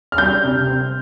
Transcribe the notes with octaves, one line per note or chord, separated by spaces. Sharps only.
F6
G3 G6
C3
C4